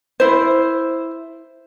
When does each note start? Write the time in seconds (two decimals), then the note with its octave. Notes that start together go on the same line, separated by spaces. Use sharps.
0.20 E4 C5